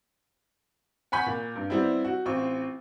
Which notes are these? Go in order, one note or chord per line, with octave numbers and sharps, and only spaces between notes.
F#5 G#5 B5 C#6 G6
A#2
G2
G3 B3 C4 E4
F#4
A1 C4 F4 C#6